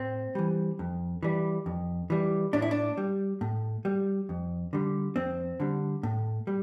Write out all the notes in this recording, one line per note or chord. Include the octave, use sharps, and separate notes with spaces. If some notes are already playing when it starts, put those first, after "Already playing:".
Already playing: A2 C4
E3 G3
F2
E3 G3
F2
E3 G3
A2 D4
E4
D4
G3
A2
G3
F2
D3 G3
F2 C4
D3 G3
A2
G3